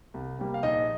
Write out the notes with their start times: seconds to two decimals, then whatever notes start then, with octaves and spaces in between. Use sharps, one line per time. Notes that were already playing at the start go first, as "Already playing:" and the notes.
0.14 C2
0.39 C3 G3 A#3
0.54 F5
0.63 A#1 D#4 D#5